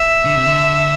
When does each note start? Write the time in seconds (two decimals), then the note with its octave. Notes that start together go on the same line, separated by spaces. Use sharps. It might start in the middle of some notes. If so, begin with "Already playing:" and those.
Already playing: E5
0.25 D3
0.35 C3
0.46 D3